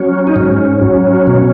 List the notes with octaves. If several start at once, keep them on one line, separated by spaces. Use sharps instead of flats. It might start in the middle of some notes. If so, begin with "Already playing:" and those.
Already playing: F#3 C#4
D#4
G#2 C#4
F#3
B2